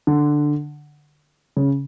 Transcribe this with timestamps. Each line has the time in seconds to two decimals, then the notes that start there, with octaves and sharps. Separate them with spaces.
0.07 D3
1.57 C#3